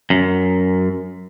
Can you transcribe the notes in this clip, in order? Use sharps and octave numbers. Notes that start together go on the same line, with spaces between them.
F#2